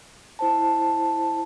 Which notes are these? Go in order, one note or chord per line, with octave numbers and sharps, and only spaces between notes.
E4 C5 A5